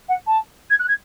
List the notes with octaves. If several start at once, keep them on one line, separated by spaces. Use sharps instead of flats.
F#5
A5
G#6
F#6
G#6